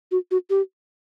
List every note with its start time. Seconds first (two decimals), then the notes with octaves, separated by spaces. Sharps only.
0.11 F#4
0.31 F#4
0.50 G4